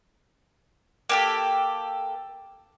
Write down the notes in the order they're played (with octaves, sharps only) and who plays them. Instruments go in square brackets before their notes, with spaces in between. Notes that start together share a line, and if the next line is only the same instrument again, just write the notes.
[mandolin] A#3 G4 A4